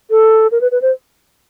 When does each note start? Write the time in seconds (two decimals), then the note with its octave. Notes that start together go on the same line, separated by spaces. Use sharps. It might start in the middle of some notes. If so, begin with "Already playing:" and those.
0.10 A4
0.52 A#4
0.61 B4
0.71 B4
0.82 C5